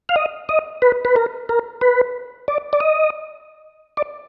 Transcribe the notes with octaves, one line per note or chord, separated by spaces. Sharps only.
F5
D#5
D#5
B4
B4
A#4
A#4
B4
D5
D5
D#5
D5